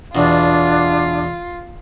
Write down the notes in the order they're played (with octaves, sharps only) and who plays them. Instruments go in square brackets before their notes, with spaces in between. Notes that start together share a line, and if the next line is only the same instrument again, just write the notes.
[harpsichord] E2 B2 [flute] D4 [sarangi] F4